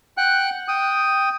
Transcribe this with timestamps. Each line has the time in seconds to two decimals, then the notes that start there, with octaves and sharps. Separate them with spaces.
0.17 F#5 G5 F#6
0.68 G5 D#6